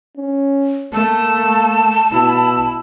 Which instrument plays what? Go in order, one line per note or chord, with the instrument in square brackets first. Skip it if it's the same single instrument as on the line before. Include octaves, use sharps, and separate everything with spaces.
[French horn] C#4
[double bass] A3 [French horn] A#3 [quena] A5
[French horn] B2 [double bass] E4